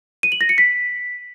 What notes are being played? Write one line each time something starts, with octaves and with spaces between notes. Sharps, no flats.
D#7
F#7
A#6
C#7
B6